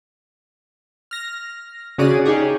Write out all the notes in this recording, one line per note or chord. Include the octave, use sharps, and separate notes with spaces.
F6 A#6
C#3 C#4 F#4 G#4 D5 D#7
C#4 D#4 G4 G#4